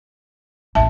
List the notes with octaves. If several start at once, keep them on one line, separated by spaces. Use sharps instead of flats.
A1 E2 E5 A5